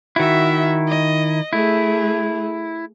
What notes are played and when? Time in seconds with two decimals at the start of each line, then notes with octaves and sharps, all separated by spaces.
0.16 D#3 E4 F#4 E5
0.88 D#5
1.53 A3 E4 G#4